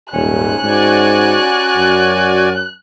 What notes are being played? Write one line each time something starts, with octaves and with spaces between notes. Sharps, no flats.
D#1 G#2 C#4 F#6
G#2 F#4 D5 G#5
F#2